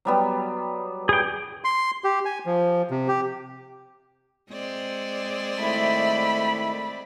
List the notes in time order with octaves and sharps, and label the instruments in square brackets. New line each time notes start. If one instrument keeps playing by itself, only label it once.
[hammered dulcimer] F#3 G3 B3
[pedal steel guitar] G#4 G5
[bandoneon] C6
G4
G#5
F3
C3
G4
[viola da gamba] G#3 C4 D5
[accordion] D#3 E4 [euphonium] A3 [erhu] B5